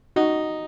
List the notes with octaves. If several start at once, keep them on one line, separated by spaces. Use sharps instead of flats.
D#4 F#4